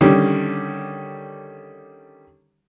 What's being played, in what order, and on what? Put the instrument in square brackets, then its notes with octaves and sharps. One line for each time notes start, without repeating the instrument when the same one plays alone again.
[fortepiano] D3 D#3 G3 C#4